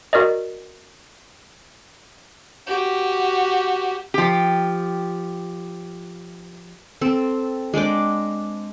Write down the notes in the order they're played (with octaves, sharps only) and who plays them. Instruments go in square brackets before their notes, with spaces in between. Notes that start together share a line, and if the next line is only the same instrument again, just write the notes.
[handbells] F#4 A#4 D5 D#5
[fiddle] F#4 G4
[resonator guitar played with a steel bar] F3 G4
[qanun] C4 A4
G#3 D4 G5 D6